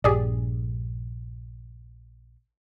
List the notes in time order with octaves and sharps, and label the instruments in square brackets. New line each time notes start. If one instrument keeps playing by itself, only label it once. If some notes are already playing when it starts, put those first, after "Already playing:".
[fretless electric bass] A#1 G2 [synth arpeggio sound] G4 G#4 D5